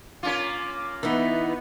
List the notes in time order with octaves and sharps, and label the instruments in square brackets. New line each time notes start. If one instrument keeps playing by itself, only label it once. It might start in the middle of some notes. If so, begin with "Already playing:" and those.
[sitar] A#3 C#4 F4 [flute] D6
[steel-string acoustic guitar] E3 D#4 [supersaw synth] B3 [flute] E5